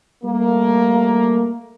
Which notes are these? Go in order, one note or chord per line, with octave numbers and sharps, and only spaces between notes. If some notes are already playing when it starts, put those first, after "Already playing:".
G3 A3 A#3